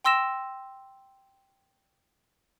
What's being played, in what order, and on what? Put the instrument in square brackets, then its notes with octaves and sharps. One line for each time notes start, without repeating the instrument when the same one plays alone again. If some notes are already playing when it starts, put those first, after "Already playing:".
[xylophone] G5 C6 E6 A#6 E7